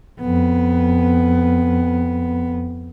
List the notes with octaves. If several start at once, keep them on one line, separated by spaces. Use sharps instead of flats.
F2 B3